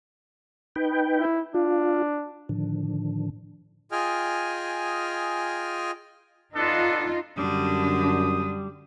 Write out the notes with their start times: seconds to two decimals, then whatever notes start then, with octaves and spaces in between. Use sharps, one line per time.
0.76 D#4 B4 G5
1.19 E4
1.54 D4 F4
2.49 A2 D3 D#3 F3 D4
3.92 F4 G#4 D#5 G5 G#5 F6
6.56 B3 D4 D#4 F4 A4
7.38 F#2 D3 G3 D4 D#6